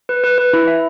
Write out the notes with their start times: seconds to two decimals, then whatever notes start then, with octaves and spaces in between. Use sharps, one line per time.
0.09 B4
0.24 B4
0.38 B4
0.53 E4
0.67 E5